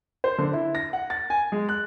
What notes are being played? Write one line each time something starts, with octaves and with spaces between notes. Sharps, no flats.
C5
D3
E4
A#6
F#5
A6
G#5
G#3
F#6